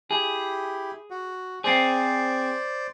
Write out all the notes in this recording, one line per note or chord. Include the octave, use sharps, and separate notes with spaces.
E4 G4 G#4
F#4
C4 G#4 C5 D5